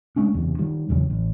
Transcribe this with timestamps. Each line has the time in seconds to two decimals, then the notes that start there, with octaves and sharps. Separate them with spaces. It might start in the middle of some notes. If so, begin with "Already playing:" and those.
0.16 G#3 A3 C#4 D4
0.34 F#1 E2 C3
0.59 D#3 G3
0.89 A#1 E2 C#3 F#3
1.10 A1